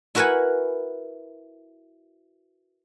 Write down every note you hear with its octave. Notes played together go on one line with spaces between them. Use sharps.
E4 F#4 A#4 B4 F#5 G#5